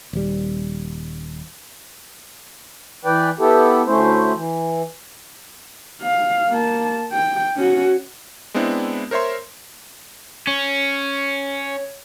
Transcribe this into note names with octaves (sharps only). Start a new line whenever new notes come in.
D#1 G3
E3 B4 D5 G5
B3 E4 G4 A4
D2 A3 C#4 E4 C5
E3
F5
A#3 A5
G5
C#4 F#4
G#3 B3 C4 D4 E4
A#4 C5 C#5 E5 C6
C#4 C#5